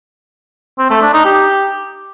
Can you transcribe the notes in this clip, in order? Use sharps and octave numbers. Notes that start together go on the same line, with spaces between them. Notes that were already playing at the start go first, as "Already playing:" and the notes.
C4
A3
D4
D#4
G4